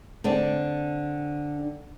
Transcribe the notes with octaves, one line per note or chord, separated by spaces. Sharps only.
D3 C4 D4